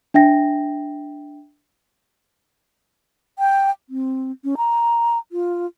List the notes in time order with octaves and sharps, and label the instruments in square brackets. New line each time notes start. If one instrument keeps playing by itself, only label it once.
[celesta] D4 E5 G5 A#6
[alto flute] G5
C4
C#4
A#5
F4